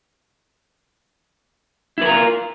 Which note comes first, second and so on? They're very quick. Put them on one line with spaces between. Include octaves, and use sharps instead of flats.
E4 B4 A#4 F4